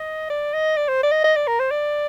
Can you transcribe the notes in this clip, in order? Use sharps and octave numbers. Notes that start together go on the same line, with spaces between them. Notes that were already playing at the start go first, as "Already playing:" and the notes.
Already playing: D#5
D5
D#5
D5
C5
D5
D#5
D#5
D5
A#4
C5
D5